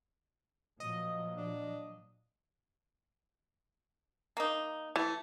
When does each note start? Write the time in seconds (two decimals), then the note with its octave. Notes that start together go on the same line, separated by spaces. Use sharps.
0.80 A#2 F3 F#3 D#5
1.35 D4
4.37 A#3 D#4
4.96 E3 A3